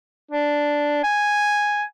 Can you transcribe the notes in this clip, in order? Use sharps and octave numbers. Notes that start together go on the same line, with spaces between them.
D4
G#5